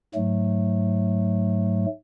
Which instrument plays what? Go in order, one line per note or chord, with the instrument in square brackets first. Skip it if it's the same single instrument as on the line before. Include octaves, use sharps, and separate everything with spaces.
[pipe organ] G#2 F#3 A3